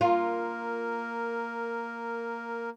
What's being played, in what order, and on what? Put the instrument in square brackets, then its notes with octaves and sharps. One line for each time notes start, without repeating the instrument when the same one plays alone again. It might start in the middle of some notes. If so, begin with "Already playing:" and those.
[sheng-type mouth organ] A#3 A#4 [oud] F4